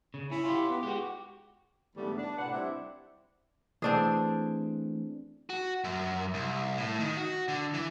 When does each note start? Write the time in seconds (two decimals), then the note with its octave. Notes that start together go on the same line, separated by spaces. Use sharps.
0.14 C#3
0.31 C#4 E4
0.45 F4 G4
0.69 B3
0.83 G#3 F#4 G4
1.96 G#2 D3 E3 G3 A3 B3
2.17 D4
2.38 A2 C3 B4 F#5
2.51 G3 C4 D4 E4
3.82 E3 A3 C4 D4 G#4
5.50 F#4
5.84 F#2
6.34 C2
6.77 A2
7.00 D#3
7.17 F#4
7.48 D3
7.74 E3